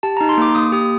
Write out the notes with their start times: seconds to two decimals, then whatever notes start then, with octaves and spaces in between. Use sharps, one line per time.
0.03 G4 A5
0.17 D#4 A#5
0.29 C6
0.37 A#3 D6
0.55 A#3 D#6
0.72 G4 D#6